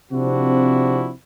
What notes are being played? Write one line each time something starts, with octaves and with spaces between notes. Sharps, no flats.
C3 F3 C4 D4 E4 F#4